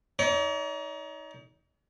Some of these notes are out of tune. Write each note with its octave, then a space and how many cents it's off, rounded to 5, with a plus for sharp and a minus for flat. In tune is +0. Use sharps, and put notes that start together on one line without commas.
D#4 +20 C#5 +45